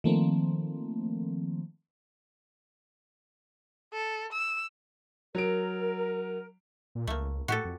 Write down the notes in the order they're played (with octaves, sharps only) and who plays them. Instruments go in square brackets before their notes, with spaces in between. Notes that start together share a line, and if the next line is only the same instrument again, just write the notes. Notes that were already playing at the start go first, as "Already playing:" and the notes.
[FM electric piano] D#3 F3 A3 A#3 C4
[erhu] A4
E6
[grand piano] F#3 D7 [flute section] A#4
[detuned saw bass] A#2
[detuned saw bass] C#2 [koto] A3 A#3
[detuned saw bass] A2 [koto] F#4 G4 A4
[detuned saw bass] F2